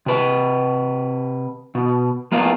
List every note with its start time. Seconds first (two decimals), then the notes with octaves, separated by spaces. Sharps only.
0.06 C3 B4
1.75 B2
2.32 F3 A#3 B3 F4